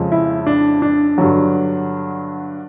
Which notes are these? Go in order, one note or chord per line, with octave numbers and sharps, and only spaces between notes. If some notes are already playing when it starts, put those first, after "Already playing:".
Already playing: F2 C#3 F3 G#3
E4
D4
D4
G2 D3 F#3